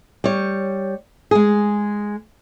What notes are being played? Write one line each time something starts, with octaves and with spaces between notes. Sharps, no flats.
G3 C#5
G#3 G#4